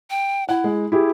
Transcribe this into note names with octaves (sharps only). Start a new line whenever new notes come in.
G5
E4 F#5
G#3
E4 G4 G#4